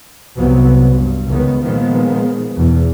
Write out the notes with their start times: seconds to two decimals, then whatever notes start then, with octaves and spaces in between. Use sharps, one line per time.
0.36 C2 C3 F#3 B3
0.94 G2
1.27 C#2 D#3 B3
1.62 A#2 D#3 F3 G#3 B3
2.56 E2 B2